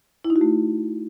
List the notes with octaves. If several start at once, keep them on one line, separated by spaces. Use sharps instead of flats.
E4
D#4
F#4
A3